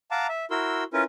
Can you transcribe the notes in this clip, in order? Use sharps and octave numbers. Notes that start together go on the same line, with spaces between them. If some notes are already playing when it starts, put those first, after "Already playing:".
F5 F#5 A5 A#5 D6
E5
E4 F#4 A#4 C6 E6
C#4 E4 F4 A#4 B4